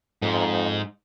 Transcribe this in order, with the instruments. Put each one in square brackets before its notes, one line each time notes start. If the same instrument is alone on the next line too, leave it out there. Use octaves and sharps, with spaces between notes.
[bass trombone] F2 [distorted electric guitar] G#2